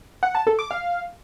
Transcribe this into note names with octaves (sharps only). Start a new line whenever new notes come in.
F#5
A5
A4
D6
F5